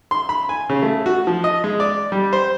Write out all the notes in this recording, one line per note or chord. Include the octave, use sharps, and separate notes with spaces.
C6
B5
G#5
C#3
A3
F#4
F3
D#5
G#3
D5
G3
C5